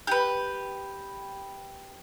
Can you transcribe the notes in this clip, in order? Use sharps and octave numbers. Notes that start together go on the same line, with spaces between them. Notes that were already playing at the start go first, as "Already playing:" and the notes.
G4 B4